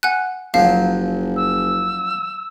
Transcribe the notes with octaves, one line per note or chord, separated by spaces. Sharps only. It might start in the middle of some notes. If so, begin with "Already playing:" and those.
F#5 G#5 F#6
F#1 F3 F#3 F5
E6